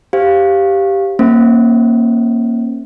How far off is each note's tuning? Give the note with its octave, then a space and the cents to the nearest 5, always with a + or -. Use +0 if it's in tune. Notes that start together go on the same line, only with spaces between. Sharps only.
G4 +0 C5 +0 F5 +0
A#3 +0 C#4 -30 C5 +0